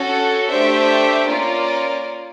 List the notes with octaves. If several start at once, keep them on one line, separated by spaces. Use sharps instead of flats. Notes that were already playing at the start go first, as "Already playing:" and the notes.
Already playing: C#4 F#4 A4
A3 D4 G4 C5 E5
A#3 C#4 F4 A#4 D5